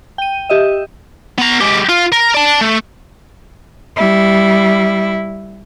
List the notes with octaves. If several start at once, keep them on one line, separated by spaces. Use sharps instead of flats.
G5 D#7
G4 D#5 E5
B3 A#5
G#3 G4
F4
A#4
D5 A5
A3
G3 E4